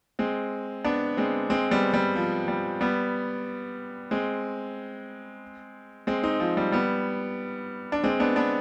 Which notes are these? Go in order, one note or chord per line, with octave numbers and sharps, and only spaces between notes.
G#3 C4
B3 D4
G#3 C4
G#3 C4
G3 B3
G3
F3
G3
G3 B3
G#3 C4
G#3 C4
C4 D#4
F3
G3
G3 B3
D4
G#3 C4
B3 D4
B3 D4